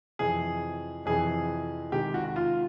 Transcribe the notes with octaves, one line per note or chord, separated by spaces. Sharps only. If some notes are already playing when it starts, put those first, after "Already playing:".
F2 C3 E3 G#4
F2 C3 E3 G#4
C3 D#3 G#3 G4
F#4
F#4
F4